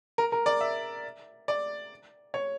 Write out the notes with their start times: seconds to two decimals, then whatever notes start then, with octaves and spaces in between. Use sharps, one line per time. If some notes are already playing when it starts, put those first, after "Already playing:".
0.18 A#4
0.32 A#4
0.46 D5
0.61 E5
1.48 D5
2.34 C#5